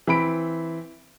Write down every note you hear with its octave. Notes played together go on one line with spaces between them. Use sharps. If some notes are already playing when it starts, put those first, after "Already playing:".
E3 C4 B5 D7